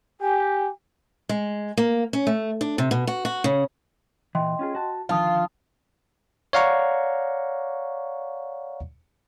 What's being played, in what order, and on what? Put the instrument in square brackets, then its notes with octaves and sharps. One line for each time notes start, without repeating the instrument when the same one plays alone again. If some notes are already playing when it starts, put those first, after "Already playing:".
[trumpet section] G4 [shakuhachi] G#5
[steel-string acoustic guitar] G#3
A#3
C#4
A3
D4
C3
B2
F#4
F#4
C#3
[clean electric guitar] A#2 E3 [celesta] D#5 G5 C6
[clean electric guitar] C#4 F4 G#4
F#4 A5
[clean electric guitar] D3 D#3 F3 [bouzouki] F4 [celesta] F5 A5 D#6
[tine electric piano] C#5 D5 F5 F#5 A#5 C#6